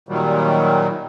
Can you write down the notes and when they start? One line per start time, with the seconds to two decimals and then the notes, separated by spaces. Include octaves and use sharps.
0.09 A#2 D#3 F#3 G3